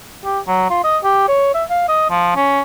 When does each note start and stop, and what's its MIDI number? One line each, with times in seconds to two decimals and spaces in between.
0.24 0.40 67
0.47 0.68 54
0.70 0.80 65
0.84 0.98 75
1.04 1.25 67
1.28 1.50 73
1.54 1.64 76
1.70 1.87 77
1.88 2.06 75
2.10 2.34 53
2.36 2.62 61